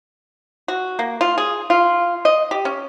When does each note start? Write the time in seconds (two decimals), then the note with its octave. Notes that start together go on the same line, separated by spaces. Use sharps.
0.68 F#4
0.99 A#3
1.21 F4
1.38 G#4
1.70 F4
2.25 D#5
2.51 G4
2.65 C#4